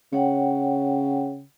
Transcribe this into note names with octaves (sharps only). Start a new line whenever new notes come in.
C#3 C#5 F#5 G5